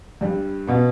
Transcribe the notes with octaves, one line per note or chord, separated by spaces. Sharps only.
G2 G3
B2 B3